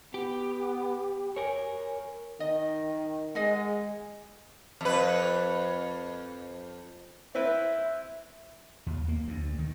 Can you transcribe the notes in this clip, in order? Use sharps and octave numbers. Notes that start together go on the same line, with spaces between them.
B3 G4
A#4 C#5 G#5
D#3 D#5
G#3 G#4 D#5 F#5
F2 B4
C4 E4 B4 E5
D#2
A#3
D2
D#3